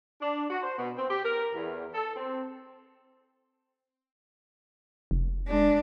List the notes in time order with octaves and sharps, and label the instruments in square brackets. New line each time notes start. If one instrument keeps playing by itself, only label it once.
[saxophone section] D4
F#4
C5
B2
C4
G4
A#4
E2
A4
C4
[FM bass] F1
[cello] G#3 D4